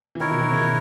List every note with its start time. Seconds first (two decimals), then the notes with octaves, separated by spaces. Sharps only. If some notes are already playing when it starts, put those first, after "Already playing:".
0.15 E3
0.20 D#3 E4 A#4 C#5
0.31 B2
0.41 D#3
0.51 C#3
0.61 B2